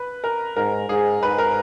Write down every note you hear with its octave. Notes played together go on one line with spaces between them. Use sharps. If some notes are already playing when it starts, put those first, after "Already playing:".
Already playing: B4
A#4
G#2 A#4
G#2 G#4
G#2 B4
A#4